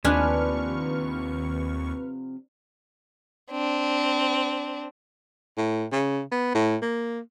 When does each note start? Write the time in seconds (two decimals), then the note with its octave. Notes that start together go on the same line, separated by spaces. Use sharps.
0.04 D#2 C3 F3 D4 B4 G#5 C#6 F6
3.50 C4 D4
5.57 A2
5.92 C#3
6.32 B3
6.55 A2
6.82 A#3